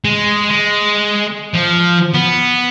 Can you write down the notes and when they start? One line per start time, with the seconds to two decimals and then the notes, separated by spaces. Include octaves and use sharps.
0.05 G#3
0.51 G#3
1.55 F3
2.14 B3